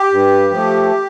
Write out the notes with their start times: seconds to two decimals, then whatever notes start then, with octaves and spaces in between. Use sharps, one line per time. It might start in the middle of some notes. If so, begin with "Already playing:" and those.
Already playing: G4
0.12 G2
0.51 F3 A3